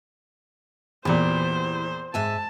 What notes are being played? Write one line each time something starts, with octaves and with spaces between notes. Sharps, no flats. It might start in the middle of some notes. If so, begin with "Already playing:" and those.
E2 A#2 E3 G4 C5
G#2 E5 G#5 A5